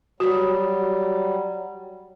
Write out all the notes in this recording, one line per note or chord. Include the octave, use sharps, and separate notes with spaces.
F#3 G3 F#4